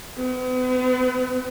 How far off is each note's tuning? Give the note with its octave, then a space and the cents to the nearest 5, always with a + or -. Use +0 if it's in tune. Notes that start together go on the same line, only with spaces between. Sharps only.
B3 +45